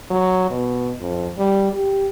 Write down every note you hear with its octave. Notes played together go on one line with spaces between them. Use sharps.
F#3
B2
F2
G3
G4